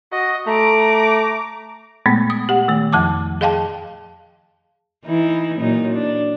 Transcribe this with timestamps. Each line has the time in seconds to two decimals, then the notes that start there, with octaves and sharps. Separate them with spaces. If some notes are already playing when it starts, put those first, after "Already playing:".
0.12 F#4 D#5
0.47 A3 A#5 D6
2.06 A#2 G#3 A3 B3
2.30 D#6
2.49 G4 F#5
2.68 D#3 A3
2.93 F2 F3 A5 D6
3.41 G#4 D#5 F5 G5 A5
5.05 E3 D#4 E4
5.60 A#2 F#3 D#4
5.95 D4